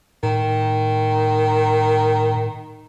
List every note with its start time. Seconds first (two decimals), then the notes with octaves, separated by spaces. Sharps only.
0.23 A2 D#3